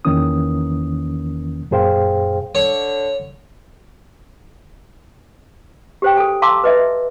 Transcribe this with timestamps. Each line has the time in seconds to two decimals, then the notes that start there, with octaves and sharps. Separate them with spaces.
0.05 E2 D#3 E3 A#3 C#4 D#6
1.71 F#2 A#2 G#4 C5 F5 G5
2.55 D3 C#5
6.02 G4 C5 G5
6.17 A4 G#5
6.42 F5 A5 A#5 C6 D6 E6
6.64 B4 D#5 E5